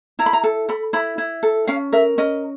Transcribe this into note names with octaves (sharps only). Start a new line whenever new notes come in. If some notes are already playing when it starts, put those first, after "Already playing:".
E4 A#5
B5
A#5
A4
A4 B5
E4 B5
E4
A4
C#4 F5
A#4 E5
C#4 D#5